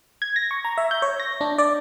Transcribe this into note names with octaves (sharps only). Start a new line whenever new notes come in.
G#6
A#6
C#6
A#5
E5
G6
C#5
A#6
D4
D5